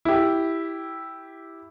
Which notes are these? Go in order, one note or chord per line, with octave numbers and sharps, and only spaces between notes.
E4 G4